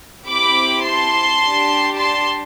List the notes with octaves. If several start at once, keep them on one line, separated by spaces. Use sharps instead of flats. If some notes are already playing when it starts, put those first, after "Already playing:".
C4 E4 G4 B5 D6
A5 C6
D4 G4
A5 C6